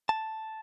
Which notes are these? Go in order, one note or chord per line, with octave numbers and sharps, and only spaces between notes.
A5